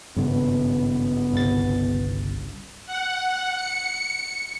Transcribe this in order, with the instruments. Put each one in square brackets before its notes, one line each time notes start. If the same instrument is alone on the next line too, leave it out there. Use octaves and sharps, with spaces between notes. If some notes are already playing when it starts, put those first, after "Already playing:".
[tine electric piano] G#1 [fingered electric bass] G2 C#3 [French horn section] B3
[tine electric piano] G1 C2 A6
[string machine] F#5
C#7